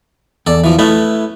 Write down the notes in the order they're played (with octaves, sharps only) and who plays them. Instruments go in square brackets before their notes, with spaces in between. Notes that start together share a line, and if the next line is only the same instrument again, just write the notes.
[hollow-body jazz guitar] E2 [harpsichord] A4 D5
[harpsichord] E3 F3
[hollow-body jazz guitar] A3 [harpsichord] B3 C#4 E4